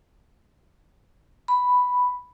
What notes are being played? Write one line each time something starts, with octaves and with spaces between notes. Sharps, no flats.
B5